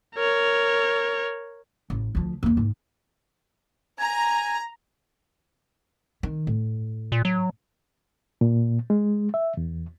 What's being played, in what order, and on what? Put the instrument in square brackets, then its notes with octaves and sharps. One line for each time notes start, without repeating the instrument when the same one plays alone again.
[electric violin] A#4 C#5
[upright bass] A1
D2 F3
E2 A#3
G#2
[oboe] G#5 [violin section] A#5
[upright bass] D#3
A2
[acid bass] A#2
F#3
[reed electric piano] A#2
G#3
E5
E2